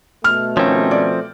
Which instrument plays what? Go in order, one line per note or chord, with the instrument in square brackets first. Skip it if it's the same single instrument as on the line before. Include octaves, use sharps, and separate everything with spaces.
[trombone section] B2 A3 [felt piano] F6
[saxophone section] D#3 A#3 C#4 [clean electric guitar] F3 C4
[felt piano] D5